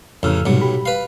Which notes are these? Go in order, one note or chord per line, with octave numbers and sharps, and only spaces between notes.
A1 F2 C#3 E6 F6
B1 G#2 C3 F#3 G3
G4 B5
B4 F5